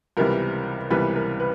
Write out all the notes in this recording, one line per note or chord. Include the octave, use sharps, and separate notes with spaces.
C#2 C3 E3 G3 B3 A#4
C#2 C3 E3 G3 B3 B4
A#4
B4